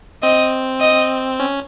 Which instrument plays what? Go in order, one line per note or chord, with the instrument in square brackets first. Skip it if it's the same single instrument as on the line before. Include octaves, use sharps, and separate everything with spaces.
[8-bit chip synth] C4 [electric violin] D#5
[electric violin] D#5
[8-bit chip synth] C#4